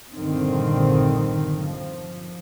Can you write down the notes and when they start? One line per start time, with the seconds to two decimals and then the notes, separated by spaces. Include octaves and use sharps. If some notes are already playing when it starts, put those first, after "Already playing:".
0.15 A#1 G2 D3 D#3 C4
1.58 F3